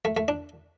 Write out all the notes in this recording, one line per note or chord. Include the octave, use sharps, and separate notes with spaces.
A3
A3
D4